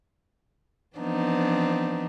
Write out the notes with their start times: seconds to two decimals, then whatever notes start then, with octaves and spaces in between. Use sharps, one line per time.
0.96 E3 F3 B3 C4 D4 D#4